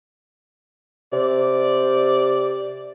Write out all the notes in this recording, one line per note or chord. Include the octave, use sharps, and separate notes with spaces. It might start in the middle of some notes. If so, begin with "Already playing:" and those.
C3 D5